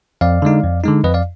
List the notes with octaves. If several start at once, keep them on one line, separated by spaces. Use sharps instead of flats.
F2 D5 F5
D3 G#3 D#4
F2
D3 G#3 D#4
F2 B4 D#5
D5 F5